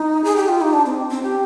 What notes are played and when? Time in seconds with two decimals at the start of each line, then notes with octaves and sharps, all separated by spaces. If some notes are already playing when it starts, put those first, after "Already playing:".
Already playing: D#4
0.24 G#4
0.36 G4
0.49 F4
0.61 D#4
0.73 D4
0.86 C4
1.10 C4
1.23 G4